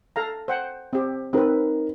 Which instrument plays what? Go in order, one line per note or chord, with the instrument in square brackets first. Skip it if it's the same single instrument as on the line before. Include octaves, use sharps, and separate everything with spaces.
[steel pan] A4 F5 A#5
C5 F#5 G5
C4 G4
[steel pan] C4 B4 [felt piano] D#4 A#4